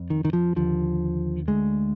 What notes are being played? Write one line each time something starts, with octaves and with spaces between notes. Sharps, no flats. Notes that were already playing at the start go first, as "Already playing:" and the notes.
Already playing: F2
D#3
D#3
F3
D#2 D3 F3
D2 D3 G#3